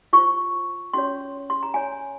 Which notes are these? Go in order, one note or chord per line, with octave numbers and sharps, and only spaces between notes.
F4 C5 C#6
C#4 F#4 C#5 C6
C6
A#5
F#4 C#5 G#5